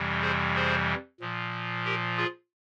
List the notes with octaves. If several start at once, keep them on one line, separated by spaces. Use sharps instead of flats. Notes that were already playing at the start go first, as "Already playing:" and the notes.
Already playing: F2 C3 E3 G3
G#4 C5
G#4 C5
A#2 F3
G4 A#4
F4 G#4